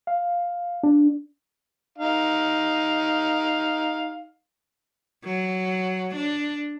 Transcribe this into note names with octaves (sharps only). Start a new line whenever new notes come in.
F5
D4
D#4 F5
F#3
D4